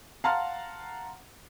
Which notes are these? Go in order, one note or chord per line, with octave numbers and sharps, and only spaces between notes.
F5 F#5 A5 A#5 C6 F6